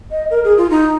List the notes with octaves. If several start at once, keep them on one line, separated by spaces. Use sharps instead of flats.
D#5
A#4
G#4
F4
D#4